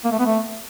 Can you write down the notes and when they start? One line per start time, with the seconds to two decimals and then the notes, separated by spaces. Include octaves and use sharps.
0.05 A#3
0.12 A3
0.19 B3
0.26 A3